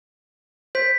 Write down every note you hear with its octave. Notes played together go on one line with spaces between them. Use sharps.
C5 G6 B6